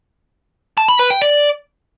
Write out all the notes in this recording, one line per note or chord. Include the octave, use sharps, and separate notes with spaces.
A5
B5
B4
G5
D5